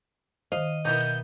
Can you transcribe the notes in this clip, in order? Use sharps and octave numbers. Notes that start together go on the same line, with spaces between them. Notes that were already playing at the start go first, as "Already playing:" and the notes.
D#3 C5 D#5 F5
B2 E3 B3 D#4 A#4 G6